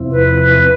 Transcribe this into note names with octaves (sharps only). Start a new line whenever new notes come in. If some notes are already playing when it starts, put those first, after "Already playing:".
Already playing: E2 C3 F3 C4 E4
B4